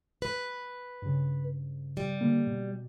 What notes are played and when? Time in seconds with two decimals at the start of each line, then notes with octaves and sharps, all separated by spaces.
0.22 B4
1.02 G2 C#3
1.97 G3
2.21 D3 A#3
2.47 B2